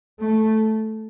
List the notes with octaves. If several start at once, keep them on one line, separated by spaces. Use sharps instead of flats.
A3